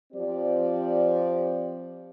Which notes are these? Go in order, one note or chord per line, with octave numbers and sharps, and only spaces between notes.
F3 C4 G4 D5